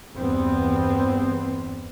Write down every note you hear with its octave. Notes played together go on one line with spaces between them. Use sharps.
E2 G2 B3 C4